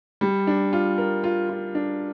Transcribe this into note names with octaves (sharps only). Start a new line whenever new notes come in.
G3
D4
F4
A#4
F4
F4
D4